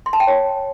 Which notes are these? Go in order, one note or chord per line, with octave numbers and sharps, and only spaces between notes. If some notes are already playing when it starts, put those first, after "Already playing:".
C6
A5
G5
C#5